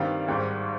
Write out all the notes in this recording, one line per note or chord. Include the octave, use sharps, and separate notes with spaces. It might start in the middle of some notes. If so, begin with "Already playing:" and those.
Already playing: G2 D#3 G3 C4 F5
G#1 G#2 G3 G5